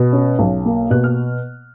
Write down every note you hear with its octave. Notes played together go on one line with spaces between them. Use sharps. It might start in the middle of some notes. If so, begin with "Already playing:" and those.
Already playing: B2
C#4
B1
A#3
B2 F#6
F6